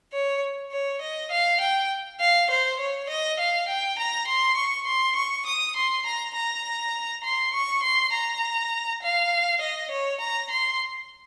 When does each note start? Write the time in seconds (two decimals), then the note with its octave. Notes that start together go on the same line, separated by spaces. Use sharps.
0.13 C#5
0.72 C#5
1.02 D#5
1.31 F5
1.61 G5
2.20 F5
2.50 C5
2.79 C#5
3.10 D#5
3.39 F5
3.68 G5
3.99 A#5
4.28 C6
4.57 C#6
4.87 C6
5.16 C#6
5.46 D#6
5.76 C6
6.06 A#5
6.35 A#5
7.24 C6
7.54 C#6
7.83 C6
8.13 A#5
9.03 F5
9.61 D#5
9.91 C#5
10.21 A#5
10.51 C6